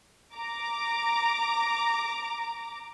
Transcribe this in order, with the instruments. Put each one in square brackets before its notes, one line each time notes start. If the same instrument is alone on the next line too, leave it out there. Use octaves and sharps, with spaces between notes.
[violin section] A#5 D6